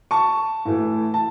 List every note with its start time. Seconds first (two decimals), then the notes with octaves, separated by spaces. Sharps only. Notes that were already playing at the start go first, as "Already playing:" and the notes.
0.11 A5 C#6
0.65 A2 E3 A3
1.14 A5